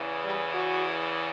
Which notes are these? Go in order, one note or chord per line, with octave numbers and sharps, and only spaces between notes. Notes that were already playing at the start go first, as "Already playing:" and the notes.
Already playing: E2 C#3 E3
G3
F#4